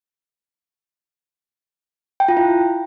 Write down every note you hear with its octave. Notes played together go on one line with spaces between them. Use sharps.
G5
F4
E4